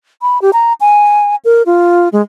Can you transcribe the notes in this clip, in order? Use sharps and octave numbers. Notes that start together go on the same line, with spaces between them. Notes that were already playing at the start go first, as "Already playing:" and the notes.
B5
G4
A#5
G#5
A#4
F4
G#3